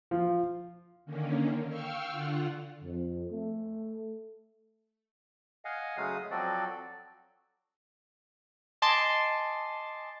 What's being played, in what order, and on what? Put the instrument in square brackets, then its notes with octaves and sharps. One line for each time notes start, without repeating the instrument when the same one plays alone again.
[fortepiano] F3
[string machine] D3 D#3 A#3 C#4
F5 G5 C#6 E6 F6
D3 F4 F#5
[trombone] F2
A3
[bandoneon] D#5 F5 F#5 G#5
C#3 F#3 G#3 A3 F5 D#6
F3 F#3 C4 F#4 A4 D5
[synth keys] D#5 G#5 A5 C6 D6